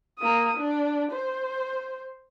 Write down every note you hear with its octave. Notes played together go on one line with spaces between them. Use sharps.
A#3 D#6
D4
C5